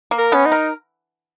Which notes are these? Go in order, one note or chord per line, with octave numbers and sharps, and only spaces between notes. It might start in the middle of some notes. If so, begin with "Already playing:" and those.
A#3
A#4
B3 C#4
D#4
A#4